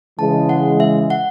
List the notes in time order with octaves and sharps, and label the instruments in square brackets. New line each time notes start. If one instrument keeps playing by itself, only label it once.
[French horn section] C#3 E3 G#3 [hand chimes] A5
[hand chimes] F#5
E5
F#5